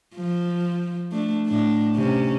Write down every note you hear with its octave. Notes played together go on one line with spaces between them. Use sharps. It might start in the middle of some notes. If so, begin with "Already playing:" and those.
F3
A3 D4
A2 D4
C3 C#4